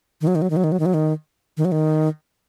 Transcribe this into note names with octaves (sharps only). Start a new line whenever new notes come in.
D#3
F#3
D#3
F#3
D#3
F#3
D#3
F#3
D#3
F#3
D#3
D#3
F#3
D#3